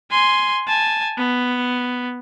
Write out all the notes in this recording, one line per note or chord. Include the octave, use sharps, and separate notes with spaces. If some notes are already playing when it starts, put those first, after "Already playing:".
G#5 C6
G#5 A5
B3